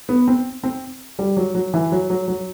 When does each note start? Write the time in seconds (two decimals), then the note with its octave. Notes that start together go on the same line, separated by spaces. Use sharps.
0.09 B3
0.28 C4
0.64 C4
1.19 G3
1.37 F#3
1.55 F#3
1.74 E3
1.92 F#3
2.10 F#3
2.28 F#3